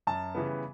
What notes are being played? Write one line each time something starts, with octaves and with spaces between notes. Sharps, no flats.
F#2 A5
C#3 E3 G3 B3